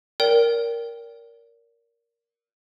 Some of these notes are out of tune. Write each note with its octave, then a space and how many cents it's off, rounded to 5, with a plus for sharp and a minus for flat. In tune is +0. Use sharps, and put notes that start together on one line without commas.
A#4 +0 D5 -35 G5 +0